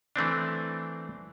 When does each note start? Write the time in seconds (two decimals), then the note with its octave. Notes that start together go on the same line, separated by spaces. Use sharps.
0.16 E3 A3 C4 D4